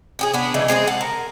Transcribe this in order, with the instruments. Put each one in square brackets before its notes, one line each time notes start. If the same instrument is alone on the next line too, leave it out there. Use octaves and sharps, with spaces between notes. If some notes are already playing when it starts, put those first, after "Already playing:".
[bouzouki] C#4 G4 G#4
B3 D4
C#3 E3 G#3 D4
G#3 C4 G4 G#4
F#5 A5
A#4